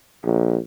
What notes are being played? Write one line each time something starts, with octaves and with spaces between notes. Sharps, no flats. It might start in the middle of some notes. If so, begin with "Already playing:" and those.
A#1